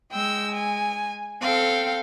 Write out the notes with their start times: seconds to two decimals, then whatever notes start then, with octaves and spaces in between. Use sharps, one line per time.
0.12 G#3 G5 E6
0.51 G#5
1.42 C4 A4 F5 G5